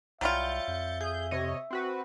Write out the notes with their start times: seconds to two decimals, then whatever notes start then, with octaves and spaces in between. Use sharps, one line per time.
0.21 C2 F#3 G3 F4 E5 G6 A6 C#7
0.68 F2
1.01 G#4 G6
1.31 C3 C#5 D#5
1.71 C4 F#4 B4